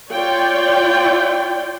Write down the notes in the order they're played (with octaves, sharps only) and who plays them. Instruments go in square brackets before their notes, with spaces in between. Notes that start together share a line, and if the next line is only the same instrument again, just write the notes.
[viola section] F4 C#5 D5 G5